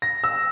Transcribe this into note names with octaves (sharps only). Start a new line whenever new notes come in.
A#6
E6